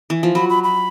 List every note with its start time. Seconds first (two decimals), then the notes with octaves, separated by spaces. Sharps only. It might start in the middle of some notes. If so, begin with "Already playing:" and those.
0.10 E3
0.23 F3
0.35 F#3 B5
0.49 B5
0.64 B5